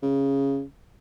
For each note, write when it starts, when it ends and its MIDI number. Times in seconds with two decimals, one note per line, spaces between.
0.02 0.63 49